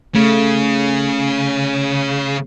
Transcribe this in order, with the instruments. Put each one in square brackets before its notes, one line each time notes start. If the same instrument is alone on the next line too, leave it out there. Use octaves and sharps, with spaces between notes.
[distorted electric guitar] C#3 [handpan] A3